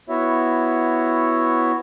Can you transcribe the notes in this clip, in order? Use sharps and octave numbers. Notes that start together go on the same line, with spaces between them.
B3 E4 F#4 C#5 E5